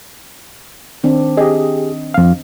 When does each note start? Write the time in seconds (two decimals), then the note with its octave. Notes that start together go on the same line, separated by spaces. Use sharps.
1.04 D#3 C4 D4
1.37 G4 G#4 D#5
2.14 F2 F5